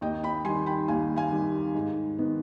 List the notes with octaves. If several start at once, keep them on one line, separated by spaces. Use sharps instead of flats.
D#2 D#5 G5
G5 B5
D#3 G3 G#5 C6
G5 B5
D#2 F5 G#5
F5 G#5
D#3 G3
G#2
D#3 B3